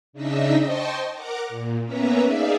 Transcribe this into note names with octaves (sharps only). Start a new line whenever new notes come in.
C#3 D4 D#4 D#5 E5 E6
C5 D#5 G5 A5 C6 C#6
A#4 F#5 A#5 D6
A#2
A#3 B3 C#4 B4 E5 A#5
D#4 G#4 D5 E5 F5